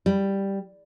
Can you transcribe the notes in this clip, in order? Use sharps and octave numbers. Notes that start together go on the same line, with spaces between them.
G3